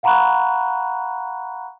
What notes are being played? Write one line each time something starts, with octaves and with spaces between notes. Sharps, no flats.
F5 F#5 A#5 B5 C#6 F#6